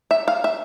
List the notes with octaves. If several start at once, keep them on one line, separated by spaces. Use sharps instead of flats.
E5
F5
E5